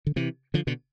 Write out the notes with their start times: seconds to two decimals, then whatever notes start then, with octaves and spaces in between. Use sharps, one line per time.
0.07 D3
0.16 C3 E3
0.54 D3 F3
0.67 B2 D3